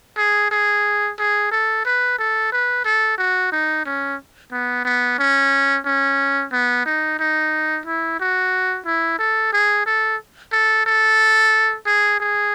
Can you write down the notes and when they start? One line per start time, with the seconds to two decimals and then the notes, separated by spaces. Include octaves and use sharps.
0.17 G#4
0.51 G#4
1.18 G#4
1.51 A4
1.85 B4
2.18 A4
2.52 B4
2.85 A4
3.18 F#4
3.52 D#4
3.86 C#4
4.52 B3
4.85 B3
5.19 C#4
5.85 C#4
6.52 B3
6.85 D#4
7.19 D#4
7.86 E4
8.20 F#4
8.85 E4
9.19 A4
9.53 G#4
9.86 A4
10.52 A4
10.86 A4
11.86 G#4
12.20 G#4